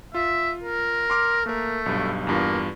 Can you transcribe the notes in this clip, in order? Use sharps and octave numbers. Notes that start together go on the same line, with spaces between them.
F4 E5
A#4
C6 D6 F6
A3 A#3 A#4
B1 G2
E2 G2 A#3 F4